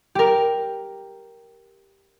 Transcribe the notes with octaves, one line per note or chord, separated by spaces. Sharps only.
G4 A#4